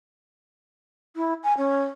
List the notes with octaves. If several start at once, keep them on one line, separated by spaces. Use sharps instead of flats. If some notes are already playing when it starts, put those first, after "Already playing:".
E4
G#5
C#4